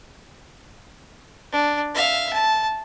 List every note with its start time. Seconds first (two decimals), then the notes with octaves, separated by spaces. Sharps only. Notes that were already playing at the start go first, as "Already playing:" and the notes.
1.52 D4
1.94 E5 F5
2.33 A5